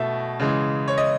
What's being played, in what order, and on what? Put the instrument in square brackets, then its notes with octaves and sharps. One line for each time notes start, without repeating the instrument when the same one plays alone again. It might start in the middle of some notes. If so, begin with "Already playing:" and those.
Already playing: [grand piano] B2 A3 E5
C#3 E3 G#3
C#5
D#5